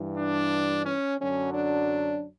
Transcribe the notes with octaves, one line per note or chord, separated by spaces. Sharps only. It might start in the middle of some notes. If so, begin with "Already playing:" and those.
Already playing: G2 E3
D4
C#4
F#2 D3 F#3 C#4
D4